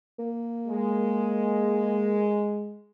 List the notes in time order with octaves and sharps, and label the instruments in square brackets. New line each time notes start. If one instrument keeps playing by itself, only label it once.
[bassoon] A#3
[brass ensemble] G#3